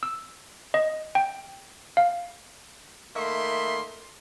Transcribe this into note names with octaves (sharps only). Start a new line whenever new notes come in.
E6
D#5
G5
F5
D#3 A3 A#3 E5 B5 C6